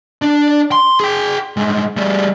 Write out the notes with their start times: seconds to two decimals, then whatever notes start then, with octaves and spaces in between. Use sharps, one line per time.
0.22 D4
0.72 C6
1.00 G#4 G5
1.57 A2 G#3
1.97 G3 A3